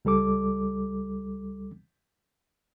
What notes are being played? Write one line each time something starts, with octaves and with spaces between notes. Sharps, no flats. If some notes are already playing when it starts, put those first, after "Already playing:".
C#2 G3 A4 D6